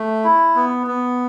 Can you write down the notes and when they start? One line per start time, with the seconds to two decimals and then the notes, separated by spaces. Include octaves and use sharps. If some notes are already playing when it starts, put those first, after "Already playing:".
Already playing: A3
0.24 E4
0.56 B3
0.87 B3